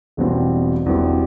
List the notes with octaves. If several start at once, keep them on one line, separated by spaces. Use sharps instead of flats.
E1 E2 B2 G3 C4
E1 E2 B2 G3 C4